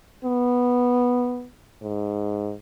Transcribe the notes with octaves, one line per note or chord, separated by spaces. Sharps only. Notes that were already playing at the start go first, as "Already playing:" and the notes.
B3
G#2